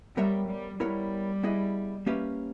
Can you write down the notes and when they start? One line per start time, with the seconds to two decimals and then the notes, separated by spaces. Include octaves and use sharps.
0.17 G3 B3 G4 A#4 C#5 E5
0.49 G3
0.80 G3 B3 E4 A#4 C#5
1.43 B3 E4 G#4 D#5
2.06 A#3 C#4 G4 B4 E5